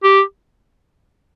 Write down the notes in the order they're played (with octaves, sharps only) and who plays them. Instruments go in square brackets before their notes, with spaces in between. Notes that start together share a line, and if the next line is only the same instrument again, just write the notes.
[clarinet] G4